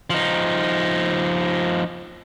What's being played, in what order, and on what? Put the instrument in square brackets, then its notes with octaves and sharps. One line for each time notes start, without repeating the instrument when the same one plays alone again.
[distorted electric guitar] F3 D#4